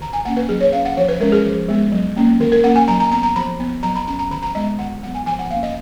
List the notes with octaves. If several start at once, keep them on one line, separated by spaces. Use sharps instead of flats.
D#3 A#5
G#5
A#3 C#4 F#5
B4
F#3 G#4
C#5
C#4 F5
F#5
F3 C#5
B4
G#3 C#4 A#4
G#4
F3
G#3 B3
F#3
A#3 C#4
D#3 A#4
A#4
A#3 C#4 F#5
G#5
F#3 A#5
A#5
B3 A#5
A#5
F3 B5
B3
F#3 A#5
B5
C#4 A#5
A#5
D#3 B5
A#5
G#3 B3 D#5
D#3 F#5
F#3 B3 F#5
G#5
F3 G#5
F#5
A#3 C#4 F5
D#5